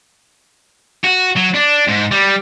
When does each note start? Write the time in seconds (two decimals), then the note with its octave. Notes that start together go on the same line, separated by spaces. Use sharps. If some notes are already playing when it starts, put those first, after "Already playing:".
1.04 F#4
1.37 F#3
1.55 D4
1.88 G#2
2.12 G3